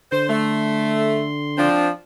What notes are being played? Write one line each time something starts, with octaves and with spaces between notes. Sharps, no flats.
D3 C5 C6
A3
F3 C4 D4